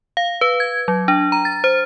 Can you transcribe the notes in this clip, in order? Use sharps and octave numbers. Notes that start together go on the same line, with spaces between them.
F5
B4
G#6
F#3
D4
A#5
A6
C5